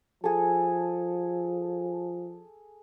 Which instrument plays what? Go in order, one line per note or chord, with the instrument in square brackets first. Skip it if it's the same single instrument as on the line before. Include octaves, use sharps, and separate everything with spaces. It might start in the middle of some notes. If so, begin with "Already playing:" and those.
[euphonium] F3 [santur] G#4 A4